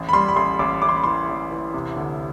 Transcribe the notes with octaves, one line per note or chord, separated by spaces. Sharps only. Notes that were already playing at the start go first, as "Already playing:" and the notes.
Already playing: A1
B5
G3 C6
B5
A1 C6
A1 D6
A1 D6
C6
B5
E3 C6
A1
E3
C3
D2